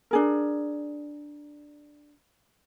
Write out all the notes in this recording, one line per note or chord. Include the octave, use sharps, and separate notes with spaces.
D4 G#4 A#4